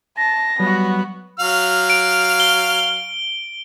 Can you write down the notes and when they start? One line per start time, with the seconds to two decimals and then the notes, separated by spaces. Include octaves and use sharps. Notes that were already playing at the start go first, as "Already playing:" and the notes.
0.17 A5 A#6
0.60 F#3 G3 B3 F#4
1.40 F#3 F5 F6
1.90 D7
2.40 G7